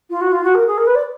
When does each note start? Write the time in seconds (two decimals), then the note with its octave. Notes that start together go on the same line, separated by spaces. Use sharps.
0.10 F4
0.21 F#4
0.32 F4
0.43 F#4
0.55 A#4
0.67 G#4
0.78 A#4
0.87 B4
0.95 D5